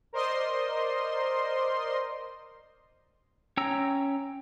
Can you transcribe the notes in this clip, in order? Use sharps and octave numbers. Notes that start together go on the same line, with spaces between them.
A#4 C5 D5 D#5 C6
C#4 C#5 G5 A#5 E6